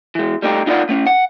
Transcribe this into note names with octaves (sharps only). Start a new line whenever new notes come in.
E3 G#3
G3 A3 D#4 G4
D2 D#4 F4 C5 D5 F#5
A3 C#4
F#5